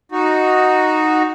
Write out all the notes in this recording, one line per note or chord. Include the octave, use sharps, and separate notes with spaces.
D#4 F#4